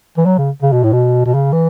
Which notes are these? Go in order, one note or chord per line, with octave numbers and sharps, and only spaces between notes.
E3
F#3
C#3
C#3
B2
A2
B2
B2
C#3
E3